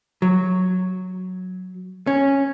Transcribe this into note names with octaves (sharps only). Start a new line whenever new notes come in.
F#3
C#4